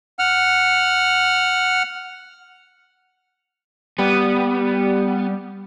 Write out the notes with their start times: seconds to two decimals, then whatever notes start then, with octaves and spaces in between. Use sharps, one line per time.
0.19 F#5 F6
3.98 G3 B3